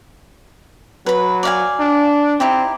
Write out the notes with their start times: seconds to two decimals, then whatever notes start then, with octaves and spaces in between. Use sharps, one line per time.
1.06 F#3 B4 B5
1.43 D5 F5 G#5
1.80 D4
2.40 C4 D#4 E4 G4